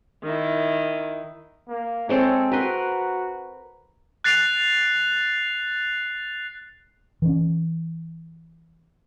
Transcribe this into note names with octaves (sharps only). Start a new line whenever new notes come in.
D#3 E4
A#3
G#3 C4 A4 C#5
F#4 A#4 B4 C6
F#6 A6 C7 F7
E3 C#4